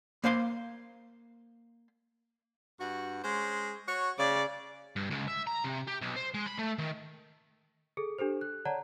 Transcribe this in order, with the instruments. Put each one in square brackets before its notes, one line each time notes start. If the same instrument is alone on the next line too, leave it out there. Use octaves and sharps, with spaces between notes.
[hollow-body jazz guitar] A#3 C5 F5 C6
[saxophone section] G2 F#4
G#3 C#4 C5
F#4 C#5
[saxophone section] C#3 [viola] D5
[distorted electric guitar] G2
C#2
E5
A#5
C3
G4
B1
C5
G#3
B5
A3
D#3
[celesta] G#4 A4
D4 G4 A4 C5
F#6
C#5 D5 F#5 A5 A#5